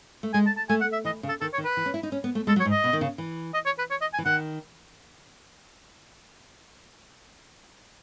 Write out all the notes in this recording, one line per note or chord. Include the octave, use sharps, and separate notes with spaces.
A3
G#3 G#5
A5
A5
A3 G#5
F#5
E5
E3 D#5
C#3
A4
D#3 A4
C#5
D#3
B4
E3
C#4
E4
D#4
C#4
B3
A3
G#3 A4
F#3
C#5
G#2
D#5
B2
D#3
C#3
E3
D#5
C#5
B4
C#5
D#5
G#5
E3
D#3 F#5